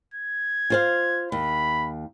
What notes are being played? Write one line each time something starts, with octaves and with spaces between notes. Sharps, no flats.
G#6
F4 C5 F5
D#2 B5